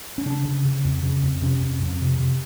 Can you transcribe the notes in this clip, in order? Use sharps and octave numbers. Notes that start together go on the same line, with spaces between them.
C#4
C#3 D4
C#3
C#3
F2
C#3
F2
C3 C#4
F2
F2
C3
C3